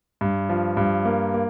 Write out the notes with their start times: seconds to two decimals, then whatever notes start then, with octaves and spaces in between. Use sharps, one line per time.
0.21 G2
0.49 F3
0.77 G2
1.05 A#3
1.34 A#3